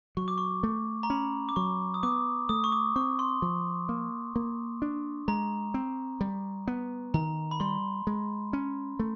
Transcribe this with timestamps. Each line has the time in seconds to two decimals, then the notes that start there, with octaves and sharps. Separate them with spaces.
0.17 F#3 C#6
0.28 D6
0.38 C#6
0.63 A3
1.03 A#5
1.10 C#4 B5
1.49 D6
1.56 F#3 C#6
1.94 D#6
2.03 B3 D6
2.49 A3 D#6
2.64 C#6
2.72 D6
2.96 C4 C#6
3.19 C6
3.42 F3
3.89 A#3
4.36 A#3
4.82 D4
5.28 G#3 A#5
5.74 C4
6.21 G3
6.68 B3
7.14 D#3 A#5
7.51 B5
7.60 G3 C6
8.07 G#3
8.53 C#4
8.99 A3